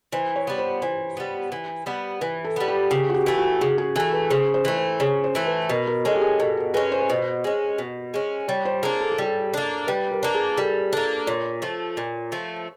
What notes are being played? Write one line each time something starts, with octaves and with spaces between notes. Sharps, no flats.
E3 C5
C#5
G3 B3
C5
E3 C5
G3 B3
E3
G3 B3
E3 B4
A4
G3 B3
G4
C#3 G4
F#4
G4
E3 A3
F#4
C#3 G#4
G#4
E3 A3 A4
B4
C#3 C5
C5
E3 A3
C5
C#3 C#5
C5
E3 A3
B4
B2 A#4
A#4
G#3 C#4 A4
G4
G#4
B2 A4
A#4
G#3 C#4 B4
C5
B4
B2 C5
G#3 C#4
B2
G#3 C#4
G3 C#5
C5
A#3 D4 G#4
A4
G#4
G3 A4
A#3 D4
G3 B4
A#4
A#3 D4
G#4
G3 A4
A#3 D4 A4
A#2 C#5
F3 A3
A#2
F3 A3